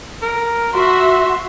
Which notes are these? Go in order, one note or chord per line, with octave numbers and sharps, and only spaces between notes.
A#4
F#4 E5 C6